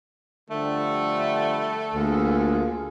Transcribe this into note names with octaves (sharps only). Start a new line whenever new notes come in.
D3 F3 G3 A3 A4
D2 A#3 F4 G#4